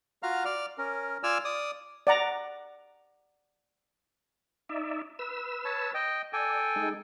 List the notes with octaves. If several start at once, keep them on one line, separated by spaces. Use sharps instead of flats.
F4 F#4 F5 A#5 F6
D5 F6
C#4 A#4
F4 D5 G#5 E6 F6
D5 D#6
D5 F#5 A#5
D#4 D5 E5
B4 E6
C#5 A5
D#5 G5
A4 D5 G5 G#5
G#3 D#4